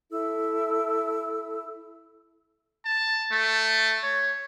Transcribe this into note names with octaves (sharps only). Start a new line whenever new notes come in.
E4 A4 E6
A5
A3
C#5